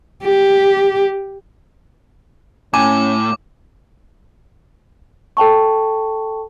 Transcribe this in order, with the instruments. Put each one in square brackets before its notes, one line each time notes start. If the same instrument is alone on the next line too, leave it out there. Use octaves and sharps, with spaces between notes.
[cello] G4
[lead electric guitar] A2 [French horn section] C#4 [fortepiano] G#5 [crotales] D6
[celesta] A4 G5 A5 C#6